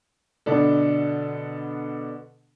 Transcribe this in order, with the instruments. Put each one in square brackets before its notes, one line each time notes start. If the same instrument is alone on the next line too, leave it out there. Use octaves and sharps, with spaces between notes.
[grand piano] B2 D3 B3 D4 A4